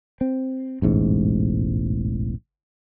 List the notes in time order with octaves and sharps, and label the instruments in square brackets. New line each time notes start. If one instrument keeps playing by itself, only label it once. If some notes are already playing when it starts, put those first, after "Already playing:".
[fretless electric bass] C4
E1 A1 G#2